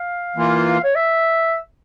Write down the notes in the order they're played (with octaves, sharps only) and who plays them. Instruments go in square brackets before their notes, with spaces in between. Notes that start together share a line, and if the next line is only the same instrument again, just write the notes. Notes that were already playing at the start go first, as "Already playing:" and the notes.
Already playing: [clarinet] F5
[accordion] E3 A#3 F4
[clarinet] C#5
E5